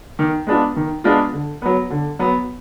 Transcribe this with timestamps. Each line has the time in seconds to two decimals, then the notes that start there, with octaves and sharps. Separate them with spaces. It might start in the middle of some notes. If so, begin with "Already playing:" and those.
0.19 D#3
0.47 G#3 B3 D4 F4
0.76 D#3
1.04 G#3 B3 D4 F4
1.33 D3
1.62 F#3 B3
1.90 D3
2.19 F#3 B3